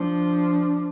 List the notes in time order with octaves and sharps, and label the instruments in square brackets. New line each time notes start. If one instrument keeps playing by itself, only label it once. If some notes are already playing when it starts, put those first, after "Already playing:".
Already playing: [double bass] F3 [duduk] D4